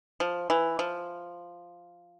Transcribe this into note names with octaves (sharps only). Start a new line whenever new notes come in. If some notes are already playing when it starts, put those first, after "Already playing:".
F3
E3
F3